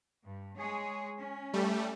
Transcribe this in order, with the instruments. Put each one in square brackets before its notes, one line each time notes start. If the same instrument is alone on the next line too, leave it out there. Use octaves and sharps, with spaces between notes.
[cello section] G2
G#3 G#4 C#5
C#4
[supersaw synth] G3 A3